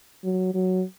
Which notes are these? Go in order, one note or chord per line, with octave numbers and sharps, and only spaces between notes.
F#3
F#3